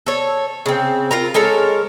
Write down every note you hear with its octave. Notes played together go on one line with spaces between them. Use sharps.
A4 C#5
C#3 C4
F4 A#4 A#5
G#3 A4 A#4 C#5